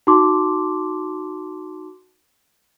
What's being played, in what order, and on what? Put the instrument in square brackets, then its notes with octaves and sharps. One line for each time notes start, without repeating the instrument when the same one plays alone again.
[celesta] D#4 F#4 A5 C6 D6